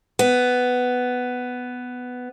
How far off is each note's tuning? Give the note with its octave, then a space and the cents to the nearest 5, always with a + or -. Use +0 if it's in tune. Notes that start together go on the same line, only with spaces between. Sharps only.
B3 +10